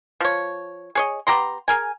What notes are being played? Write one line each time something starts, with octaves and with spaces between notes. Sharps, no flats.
F3 C#5
G#4 C#5 D#5
B3 G4 A#5 C6
G#4 A#4 G#5